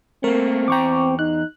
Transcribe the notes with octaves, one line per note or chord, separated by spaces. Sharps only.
A3 A#3 C4 A#4
E2 G5 A#5 C#6 D6
D#4 F#6